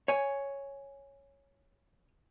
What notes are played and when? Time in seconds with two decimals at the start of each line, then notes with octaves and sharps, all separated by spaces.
0.08 C#5 G#5